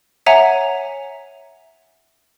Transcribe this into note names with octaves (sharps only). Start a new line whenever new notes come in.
C#5 E5 F#5 G#5 A#5